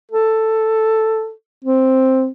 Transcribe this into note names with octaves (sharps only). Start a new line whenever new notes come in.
A4
C4